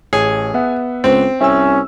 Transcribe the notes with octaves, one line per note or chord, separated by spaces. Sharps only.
A1 G#4 C#5
B3 E5 F#5
C#2 C4
C2 C#4 E5 G#5 E6